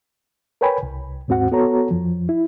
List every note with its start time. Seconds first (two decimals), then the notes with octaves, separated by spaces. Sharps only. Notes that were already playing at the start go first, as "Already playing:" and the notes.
0.61 A#4 B4 C#5 G5 G#5 B5
0.83 C2
1.28 D#2 G#2 C4 F#4 F#5
1.52 B3 F#4 A4 C#5 A#5
1.91 F2 F3
2.29 E4